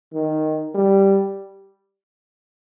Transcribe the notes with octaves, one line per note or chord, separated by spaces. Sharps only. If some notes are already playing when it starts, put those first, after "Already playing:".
D#3
G3